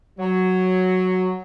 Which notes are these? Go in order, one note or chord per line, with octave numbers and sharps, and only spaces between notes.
F#3